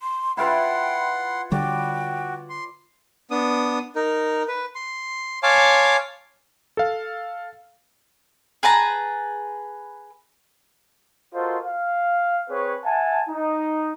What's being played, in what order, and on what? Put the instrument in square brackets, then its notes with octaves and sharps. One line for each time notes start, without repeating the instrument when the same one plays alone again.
[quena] C6
[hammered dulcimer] E4 F4 B4 [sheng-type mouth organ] F#5 C6 [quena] G5
[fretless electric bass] D3 G3 [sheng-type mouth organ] F#4 [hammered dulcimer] D5 [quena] G5
[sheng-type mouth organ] C6
B3 D4 D#6
D#4 A#4
B4
C6
C#5 F5 G#5 A5 C6 D6
[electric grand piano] A4 F5
[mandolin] G#4 B4 A5 A#5
[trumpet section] F4 F#4 A4 A#4 C5 D#5
F5
C4 G#4 B4 C#5
E5 F#5 G#5 A5
D#4